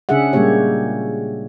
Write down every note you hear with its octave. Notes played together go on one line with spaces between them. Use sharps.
C#3 C#4 D4 G#4 E5 F#5
A#2 G3 G#3 A#3 G4 C#5